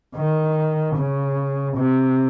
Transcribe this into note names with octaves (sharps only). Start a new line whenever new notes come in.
D#3
C#3
C3